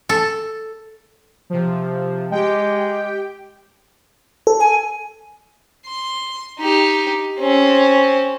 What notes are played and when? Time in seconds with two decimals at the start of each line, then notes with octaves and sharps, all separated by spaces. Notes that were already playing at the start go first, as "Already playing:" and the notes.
0.09 A4
1.50 C3 F3
2.31 G#3 G4 G5
4.47 A4
4.60 G#5
5.87 C6
6.59 D#4 G4
7.39 C4 C#4